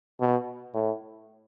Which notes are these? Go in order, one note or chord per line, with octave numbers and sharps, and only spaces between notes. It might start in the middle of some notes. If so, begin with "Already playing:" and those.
B2
A2